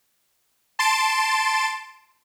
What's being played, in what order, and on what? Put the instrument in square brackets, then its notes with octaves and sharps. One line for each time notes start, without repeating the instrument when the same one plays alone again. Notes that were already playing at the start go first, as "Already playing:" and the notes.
[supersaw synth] A5 C6 A6 D7 E7